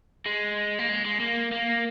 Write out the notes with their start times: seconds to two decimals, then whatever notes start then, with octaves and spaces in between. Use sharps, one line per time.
0.26 G#3
0.79 A#3
0.89 G#3
1.05 G#3
1.20 A#3
1.52 A#3